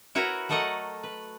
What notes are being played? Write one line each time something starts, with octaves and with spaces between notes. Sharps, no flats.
E4 F#4 A#4 B4 C#5
F#3 A3 A4 A#4 D#5 F#5
B4